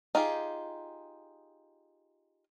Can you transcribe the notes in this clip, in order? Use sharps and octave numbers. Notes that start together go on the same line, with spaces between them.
D#4 F4 G4 G#4